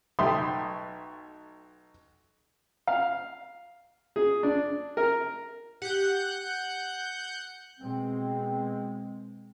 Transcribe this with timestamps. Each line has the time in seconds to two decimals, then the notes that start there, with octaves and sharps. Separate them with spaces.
0.19 B1 A3 E5 G5 C6 D#6
2.87 F5
4.16 G#4
4.43 D4
4.97 A#4
5.82 G4 F#5 F#6 G6
7.80 B2 G#3 C4